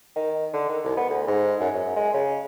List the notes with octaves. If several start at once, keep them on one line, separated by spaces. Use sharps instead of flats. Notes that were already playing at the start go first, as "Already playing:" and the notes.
D#3
D3
D#3
C2
B3
D2
G#2
F#2
F#2
G#3
C#3